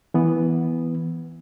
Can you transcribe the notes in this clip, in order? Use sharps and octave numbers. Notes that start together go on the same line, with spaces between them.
E3 B3